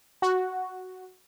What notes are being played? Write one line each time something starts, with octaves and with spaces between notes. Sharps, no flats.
F#4